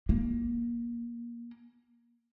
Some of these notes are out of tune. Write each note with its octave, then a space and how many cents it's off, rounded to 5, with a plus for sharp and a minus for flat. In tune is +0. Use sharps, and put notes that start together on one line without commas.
A#3 +20